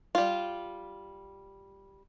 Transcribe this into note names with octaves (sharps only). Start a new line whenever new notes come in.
G3 F4